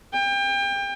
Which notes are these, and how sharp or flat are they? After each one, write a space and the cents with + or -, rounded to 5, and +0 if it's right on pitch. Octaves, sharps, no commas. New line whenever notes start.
G5 +30